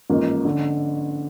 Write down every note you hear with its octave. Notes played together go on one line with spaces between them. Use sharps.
A1 G#2 F3 A#3
D3